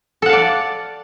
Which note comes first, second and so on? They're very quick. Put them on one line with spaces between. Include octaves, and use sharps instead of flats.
A4 F#5 F5 D5